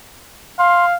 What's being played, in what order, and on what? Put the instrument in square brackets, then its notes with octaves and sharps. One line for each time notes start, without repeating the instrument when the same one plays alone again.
[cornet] F5 [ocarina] C6